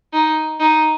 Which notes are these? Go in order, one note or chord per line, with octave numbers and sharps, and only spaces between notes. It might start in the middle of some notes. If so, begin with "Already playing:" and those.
D#4
D#4